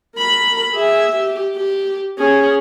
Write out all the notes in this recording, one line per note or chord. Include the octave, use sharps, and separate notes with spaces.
A#4 B5
G#4 E5
G4
G4
C#4 G#4